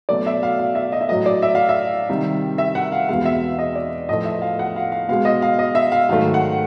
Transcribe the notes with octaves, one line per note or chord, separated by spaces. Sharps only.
B2 F#3 A3 D5
E5
F5
F5
E5
D#5
E5
A2 F#3 A3 D#5
D5
E5
F5
E5
C3 D#3 G3
E5
F#5
F5
E2 B2 G#3 F5
E5
D#5
D5
A2 F3 A3 D#5
E5
F5
F#5
F5
F5
B2 G#3 F5
D#5
F5
D#5
E5
F5
G#2 D#3 F#3 A3 F5
F#5